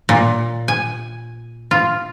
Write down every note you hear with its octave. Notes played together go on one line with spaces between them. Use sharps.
A#2
G#5
F4